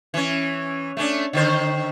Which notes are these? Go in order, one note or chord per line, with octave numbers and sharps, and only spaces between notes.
E3 C#4
A3 C#4 D4
D3 D#3 C5